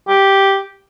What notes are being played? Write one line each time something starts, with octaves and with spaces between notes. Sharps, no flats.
G4